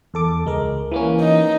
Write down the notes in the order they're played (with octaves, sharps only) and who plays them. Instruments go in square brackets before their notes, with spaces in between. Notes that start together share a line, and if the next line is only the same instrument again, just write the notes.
[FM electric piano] E2 A4 D6
C#2 G#3 A#4
E3 A#3 C#4
[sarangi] D#4